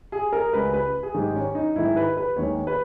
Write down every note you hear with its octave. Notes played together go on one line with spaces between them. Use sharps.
G#4
A#4
C#2 C#3 G#3 B4
B4
G#4
G#2 D#3 G#3 G4
C#4
D#4
G#2 D#3 G#3 E4
B4
B4
D#2 D#3 G#3 C#5
B4